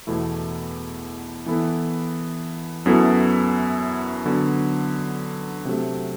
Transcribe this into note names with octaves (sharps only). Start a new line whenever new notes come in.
E2 B2 A3 E4
E3 B3 E4 A4
F#2 F#3 B3 E4 A4
D3 F#3 B3
C3 F#3 A3